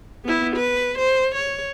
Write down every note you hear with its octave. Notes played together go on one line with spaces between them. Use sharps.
B3 E4
B4
C5
C#5